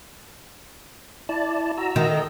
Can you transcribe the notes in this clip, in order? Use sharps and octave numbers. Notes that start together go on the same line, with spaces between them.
E4 D5 A5
F#4 A#5 E6
D#3
A4 D#5